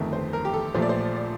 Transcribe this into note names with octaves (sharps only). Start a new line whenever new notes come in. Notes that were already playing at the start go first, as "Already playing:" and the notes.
Already playing: G1 F2 D#3 A3
C5
A#4
G4
A4
A#1 A#2 F3 A3 C5
D5
C5
D5